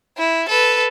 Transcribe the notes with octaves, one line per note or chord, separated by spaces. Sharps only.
E4
A4 B4